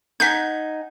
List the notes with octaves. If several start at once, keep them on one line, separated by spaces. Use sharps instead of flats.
D#4 F#5 G#5 G6 B6